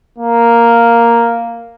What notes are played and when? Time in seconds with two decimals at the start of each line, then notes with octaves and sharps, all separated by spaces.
0.19 A#3